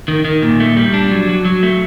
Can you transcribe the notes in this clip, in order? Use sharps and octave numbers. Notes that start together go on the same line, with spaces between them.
D#3
D#3
A#2
A3
G3
D4
F#3
F#3
F#3
A3